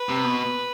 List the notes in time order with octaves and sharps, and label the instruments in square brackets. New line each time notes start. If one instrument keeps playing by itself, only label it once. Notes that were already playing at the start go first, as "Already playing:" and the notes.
Already playing: [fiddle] B4
[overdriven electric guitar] C3
B2